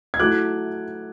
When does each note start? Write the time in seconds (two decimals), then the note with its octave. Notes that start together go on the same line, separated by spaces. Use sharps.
0.14 G#6
0.19 F#3 A3 E4 D6 F#6